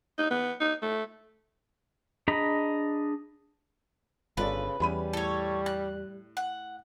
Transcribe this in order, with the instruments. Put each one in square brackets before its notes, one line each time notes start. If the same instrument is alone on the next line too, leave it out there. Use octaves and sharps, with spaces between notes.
[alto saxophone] D#4
B3
D#4
A3
[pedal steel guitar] D4 G#4 D#5 A#5 B5
[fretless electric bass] G1 [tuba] C#3 [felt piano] F4 A4 D5 [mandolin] B4
[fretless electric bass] E2 [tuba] G3 [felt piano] C#4 B5 D#7
[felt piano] A2 [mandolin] A4 C#5
[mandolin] F#6
F#5